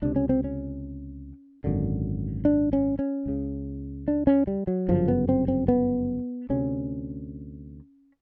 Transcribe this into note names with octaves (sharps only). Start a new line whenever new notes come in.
C#2 C3 D4
C#4
C4
C#4
G#1 F#2 D3
D4
C#4
C#4
C#2 C#3
D4
C#4
G3
F#3
G1 F#2 C#3 F3
B3
C4
C4
B3
D2 C3 C#4